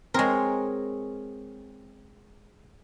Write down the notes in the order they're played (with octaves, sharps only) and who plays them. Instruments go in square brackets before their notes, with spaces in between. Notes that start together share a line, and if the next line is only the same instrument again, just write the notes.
[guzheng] G#3 A#4 [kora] C4 G#4 C#5